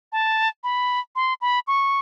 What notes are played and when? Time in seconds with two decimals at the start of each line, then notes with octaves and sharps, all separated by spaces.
0.12 A5
0.64 B5
1.16 C6
1.41 B5
1.67 C#6